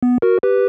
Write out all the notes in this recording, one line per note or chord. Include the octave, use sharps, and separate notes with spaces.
B3
F#4 A#4
G4 B4